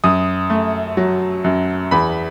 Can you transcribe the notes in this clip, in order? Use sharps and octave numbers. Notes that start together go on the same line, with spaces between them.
F#2 D#6
A3
F#3
F#2
E2 B5